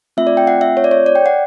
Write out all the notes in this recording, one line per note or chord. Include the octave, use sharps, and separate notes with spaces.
A3 C4 F4 E5
D5
G5
F#5
E5
C#5
D5
C#5
D5
G5
F#5